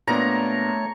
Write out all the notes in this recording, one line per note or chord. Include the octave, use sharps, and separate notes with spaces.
A#2 A3 B3 D4 C#5 A#5